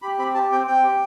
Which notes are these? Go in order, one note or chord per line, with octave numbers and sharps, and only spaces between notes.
G4 B5
C4 B5
G4 A5
C4 G5
C4 G5
G4